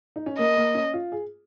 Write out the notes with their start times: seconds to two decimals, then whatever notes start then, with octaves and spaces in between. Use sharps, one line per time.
0.16 D#4
0.26 C#4
0.38 A#3 D#5
0.57 A#3
0.75 C#4
0.94 F4
1.12 G#4